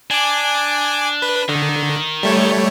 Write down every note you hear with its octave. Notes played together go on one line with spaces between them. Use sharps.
D4 G#5 D6
B4
D3 D#3
G3 A3 C#5